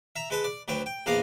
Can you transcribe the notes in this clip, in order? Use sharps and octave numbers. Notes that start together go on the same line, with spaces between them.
E5 A#5
G#3 B4 A5
D5
D2 F#3 B4 G5
G5
A#1 E2 D4 F5 A#5 D#6